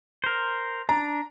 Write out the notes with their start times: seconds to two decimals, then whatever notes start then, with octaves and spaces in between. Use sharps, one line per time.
0.24 A#4 C5
0.89 D4 A#5